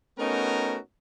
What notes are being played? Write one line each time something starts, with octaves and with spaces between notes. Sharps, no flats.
A3 B3 C#4 D#4 F#4 A#4